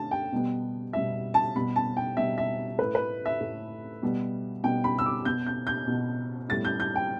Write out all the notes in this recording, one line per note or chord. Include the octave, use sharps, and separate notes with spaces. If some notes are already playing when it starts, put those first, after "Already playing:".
Already playing: D3 A3 A5
G5
B2 G3 B3
B2 G3 B3 E5
A5
B2 G3 B3 B5
A5
G5
B2 G3 B3 E5
E5
A2 A3 B4
B4
E5
A2 A3
B2 G3 B3
B2 G3 B3 G5
B5
E6
D6
B2 B3 G6
G6
G6
B2 B3
A2 G3 B3 A6
G6
G6
G5